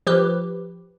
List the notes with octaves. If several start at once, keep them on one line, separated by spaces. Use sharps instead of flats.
F3 G4 B4